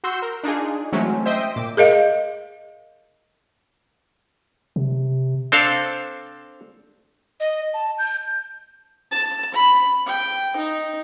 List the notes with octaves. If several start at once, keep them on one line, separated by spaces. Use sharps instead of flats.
F#4 C6 E6 G6
A#4
D4 D#4 F4 G#4
E3 F#3 G#3 A3 C4 C#4
C5 D#5 E5 G5
A#2 D6
G#4 A#4 D#5 F5
C3
C4 D4 A4 C5 F5
D#5
A5
G6
A5
B5
G5
D#4